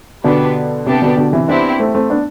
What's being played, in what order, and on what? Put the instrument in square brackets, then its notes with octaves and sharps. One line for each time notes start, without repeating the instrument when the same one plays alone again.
[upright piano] B2 D3 [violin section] B3 D4 G4 B4
[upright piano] C3 [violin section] B3 D4 G4 D5 A5
[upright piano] B2 D3
B2 D3
C3 E3
[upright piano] B3 D4 [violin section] C4 E4 G4
[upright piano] A3 C4
A3 C4
B3 D4